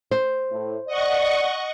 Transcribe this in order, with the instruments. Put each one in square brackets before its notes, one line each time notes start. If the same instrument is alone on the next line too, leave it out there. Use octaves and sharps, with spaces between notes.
[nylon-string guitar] C5
[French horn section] A2
[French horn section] D5 [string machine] D#5 F#5 C#6